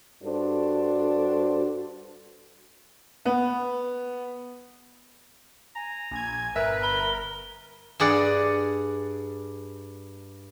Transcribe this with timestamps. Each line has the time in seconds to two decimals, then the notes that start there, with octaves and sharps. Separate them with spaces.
0.24 G2 D4 F#4 A4 C5
3.25 B3
5.76 G#5 A#5
6.11 A#1 G#5 G#6
6.55 G1 A#4 B4 E5
6.83 B5 G7
8.00 G2 G#4 D5 F#5